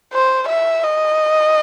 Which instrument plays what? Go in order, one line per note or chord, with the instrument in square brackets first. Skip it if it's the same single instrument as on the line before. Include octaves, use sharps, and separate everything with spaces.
[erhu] C5
E5
D#5